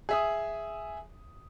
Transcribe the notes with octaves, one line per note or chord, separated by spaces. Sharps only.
G#4 E5 D#6